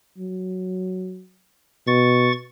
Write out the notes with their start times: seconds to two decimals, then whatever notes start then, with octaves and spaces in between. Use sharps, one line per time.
0.18 F#3
1.87 B2 C#6 A6